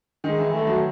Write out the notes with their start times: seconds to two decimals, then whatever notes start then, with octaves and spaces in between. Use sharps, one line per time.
0.24 D#3 G#3 D#4
0.39 E3 E4
0.53 E3 A3 E4
0.67 F#3 F#4